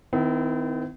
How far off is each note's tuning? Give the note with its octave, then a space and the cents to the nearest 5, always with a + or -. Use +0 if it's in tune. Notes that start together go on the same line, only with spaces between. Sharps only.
D#3 +15 C4 -45 E4 +0